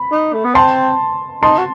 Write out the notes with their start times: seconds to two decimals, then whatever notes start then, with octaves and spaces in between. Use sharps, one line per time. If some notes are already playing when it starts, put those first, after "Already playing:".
Already playing: B5
0.12 D#4
0.33 A3
0.45 B3
0.55 C4 A5 C6
1.43 D#4 A5 C6
1.58 F#4